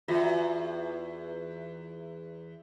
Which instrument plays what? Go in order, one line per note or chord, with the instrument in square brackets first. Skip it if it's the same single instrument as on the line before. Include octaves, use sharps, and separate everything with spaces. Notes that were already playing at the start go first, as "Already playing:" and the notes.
[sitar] E2 [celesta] F4 F#4 E5